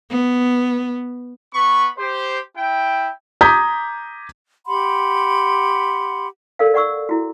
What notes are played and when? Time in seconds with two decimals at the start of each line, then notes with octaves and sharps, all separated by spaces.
0.10 B3
1.54 B3 B5 C#6
1.98 G4 C5
2.57 E4 G5
3.41 A#5 D6 D#6 G6 G#6 B6
4.66 G4 F#5 B5 C6
6.59 A4 A#4 D5 F5
6.74 D5 F#5 C#6 E6
7.09 E4 F#4